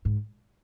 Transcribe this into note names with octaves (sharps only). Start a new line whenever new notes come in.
G#2